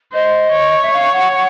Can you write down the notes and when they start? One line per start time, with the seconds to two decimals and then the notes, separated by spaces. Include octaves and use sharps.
0.13 C5 D#5
0.52 C#5
0.81 E5
0.92 F5
1.12 F#5
1.32 F#5